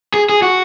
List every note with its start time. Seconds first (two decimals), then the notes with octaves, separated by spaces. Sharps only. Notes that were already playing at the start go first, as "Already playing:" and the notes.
0.14 G#4
0.29 G#4
0.42 F#4